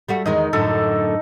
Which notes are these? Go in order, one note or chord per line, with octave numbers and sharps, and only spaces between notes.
G3 A3 F#4
E2 D#3 G#3 D#4
F#2 A2 D3 A4